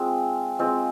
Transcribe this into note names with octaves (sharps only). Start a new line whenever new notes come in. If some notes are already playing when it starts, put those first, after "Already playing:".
Already playing: G#3 C4 F4
G#3 C4 F4